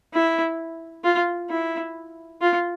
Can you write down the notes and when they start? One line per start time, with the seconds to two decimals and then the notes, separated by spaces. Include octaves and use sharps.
0.14 E4
1.04 F4
1.50 E4
2.41 F4